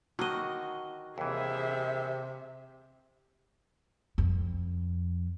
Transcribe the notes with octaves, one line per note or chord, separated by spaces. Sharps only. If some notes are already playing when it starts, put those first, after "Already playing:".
D3 D#3 F#3 F#4 D#5
D#2 C3 E3 G#4 E5
F2